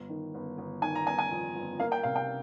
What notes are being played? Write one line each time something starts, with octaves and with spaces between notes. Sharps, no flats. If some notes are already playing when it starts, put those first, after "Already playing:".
Already playing: G1
D#3
G1
G1
D#3 G#5
A#5
G1 G#5
G#5
F2
G1
A#3 F5
G5
C3 F5
G5